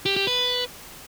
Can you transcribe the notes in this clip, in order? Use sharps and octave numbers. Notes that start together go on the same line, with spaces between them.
G4
G4
B4